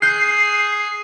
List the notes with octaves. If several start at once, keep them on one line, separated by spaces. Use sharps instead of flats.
G#4 F#6 G6 C7